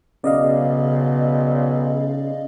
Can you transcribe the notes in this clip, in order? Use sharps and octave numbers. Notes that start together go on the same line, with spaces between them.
B1 C#3 D5 D#5 F5